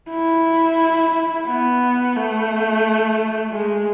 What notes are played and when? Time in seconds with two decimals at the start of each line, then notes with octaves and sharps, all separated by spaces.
0.10 E4
1.48 B3
2.16 A3
3.52 G#3